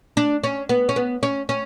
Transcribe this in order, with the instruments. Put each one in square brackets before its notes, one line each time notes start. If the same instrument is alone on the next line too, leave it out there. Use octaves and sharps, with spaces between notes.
[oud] D4
C#4
B3
C#4
B3
C#4
C#4